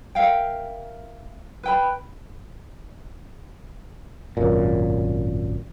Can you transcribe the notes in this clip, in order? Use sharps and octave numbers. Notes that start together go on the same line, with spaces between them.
A#4 E5 F5 G5
B4 G5 B5
G#1 F#2 A#2